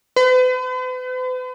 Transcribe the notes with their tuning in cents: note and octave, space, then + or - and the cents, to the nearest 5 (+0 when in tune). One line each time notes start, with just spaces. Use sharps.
B4 +45